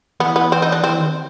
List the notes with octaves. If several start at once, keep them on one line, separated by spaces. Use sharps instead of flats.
E3 B3
B3
C4
D#4
D4
E3 C4
D#3